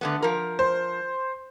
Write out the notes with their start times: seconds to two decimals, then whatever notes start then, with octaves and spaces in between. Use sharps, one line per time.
0.01 D3 A3 B3
0.22 F3 A#4
0.59 C5